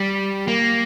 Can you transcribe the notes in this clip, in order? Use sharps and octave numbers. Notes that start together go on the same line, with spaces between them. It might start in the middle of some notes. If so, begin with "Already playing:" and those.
Already playing: G3
A#3